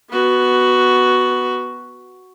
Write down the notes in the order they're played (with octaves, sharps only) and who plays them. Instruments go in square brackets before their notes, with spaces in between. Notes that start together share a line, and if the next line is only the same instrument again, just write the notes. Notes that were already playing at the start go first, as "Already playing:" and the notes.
[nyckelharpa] B3 F#4